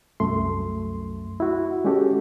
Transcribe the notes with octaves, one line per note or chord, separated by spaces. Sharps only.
C2 F#2 A3 C6
E4 F#4
G#3 C#4 F#4 G4 A4